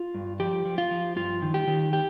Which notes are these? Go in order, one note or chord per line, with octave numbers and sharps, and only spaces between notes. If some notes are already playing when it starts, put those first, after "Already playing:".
Already playing: F4
G2
F3 G4
F3
F4
F3
G2 F4
D#3
G4
D#3
G4